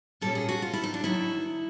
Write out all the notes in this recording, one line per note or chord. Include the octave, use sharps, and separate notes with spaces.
A#2 G3 A#3 C#4 A4
G#4
F#4
F4
E4
D#4
D4
G2 D#3 F#3 E4